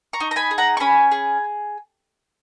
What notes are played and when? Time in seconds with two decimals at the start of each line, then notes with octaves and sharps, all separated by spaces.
0.13 A#5 C#6
0.20 D#4
0.31 A#5
0.36 G#5 B5
0.51 G#4
0.58 F#5 A#5
0.77 C#6
0.80 C#4 G#5 B5
1.11 G#4